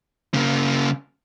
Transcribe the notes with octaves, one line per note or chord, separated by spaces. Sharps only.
C#3 A#3